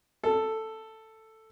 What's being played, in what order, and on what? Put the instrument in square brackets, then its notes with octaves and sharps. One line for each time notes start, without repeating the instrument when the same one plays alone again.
[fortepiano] A4